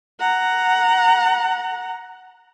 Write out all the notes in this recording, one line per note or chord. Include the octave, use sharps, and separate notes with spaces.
F#5 A#5